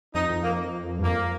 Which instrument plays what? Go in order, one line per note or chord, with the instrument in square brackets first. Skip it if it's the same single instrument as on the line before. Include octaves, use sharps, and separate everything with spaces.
[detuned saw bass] F2 [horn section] D#4
[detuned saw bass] F2
[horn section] A#3
[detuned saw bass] G2
[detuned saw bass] F2 [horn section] A#3